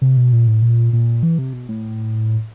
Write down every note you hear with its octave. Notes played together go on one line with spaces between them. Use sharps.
C3
B2
A#2
A2
A#2
A#2
E3
C3
B2
A2